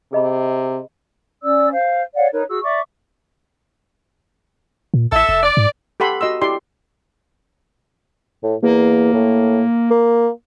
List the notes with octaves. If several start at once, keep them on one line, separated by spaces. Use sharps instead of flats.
C3 G#4 D#5 B5
C#4 D5 E6
C5 F5
C#5 D5 F5 F#5
D#4 A#4 B4 C#5
F#4 G#4 E6
D5 E5 C#6 D6
A#2
A1 A4 E5
F1
D5
G#2
G4 A4 F#5 B5 C6 E6
F#4 D#5 C6 E6
E4 G4 D5 G5 C6
A2
E2 A#3
A2
A#3